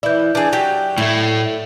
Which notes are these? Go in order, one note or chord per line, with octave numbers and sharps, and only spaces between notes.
E3 E4 D5 G6
E3 D4 G#4
F#3 G4 G5
A2 A3 E4